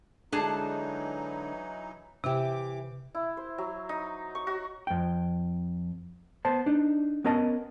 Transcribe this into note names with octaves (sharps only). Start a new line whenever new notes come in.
D3 E3 F#3 G#3 D4 D#4 G#4 A5
C3 E3 E4 G4 D6
E4
C5
F#3
D#4
C#6
F#4
F2 G5
B3 C5 A5
D4 D#4
B3 C#4 A#4 D#5 A5